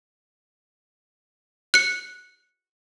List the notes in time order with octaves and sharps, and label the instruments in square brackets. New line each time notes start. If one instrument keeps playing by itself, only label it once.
[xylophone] F#6 C#7